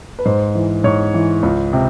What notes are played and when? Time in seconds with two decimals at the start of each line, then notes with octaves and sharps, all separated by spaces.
0.19 B4
0.25 G#2 C5
0.55 E3
0.84 G#2 C#5
1.14 E3
1.43 C#2
1.73 C3